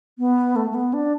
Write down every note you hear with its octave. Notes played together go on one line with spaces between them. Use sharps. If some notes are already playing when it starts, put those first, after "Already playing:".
B3
A3
A3
B3
D4